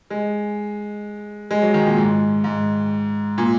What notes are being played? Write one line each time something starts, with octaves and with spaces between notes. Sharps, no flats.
G#3
G#3
F#3
D#3
A#2
G#2
G#2
A#2